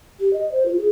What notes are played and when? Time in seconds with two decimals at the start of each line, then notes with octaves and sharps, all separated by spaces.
0.20 G4
0.34 D#5
0.52 C5
0.66 F4
0.77 G#4